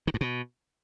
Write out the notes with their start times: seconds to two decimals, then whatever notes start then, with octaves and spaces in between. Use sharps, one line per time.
0.07 D#3
0.14 G2
0.21 B2